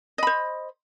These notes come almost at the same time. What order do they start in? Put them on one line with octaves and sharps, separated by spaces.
D#5 B5 C5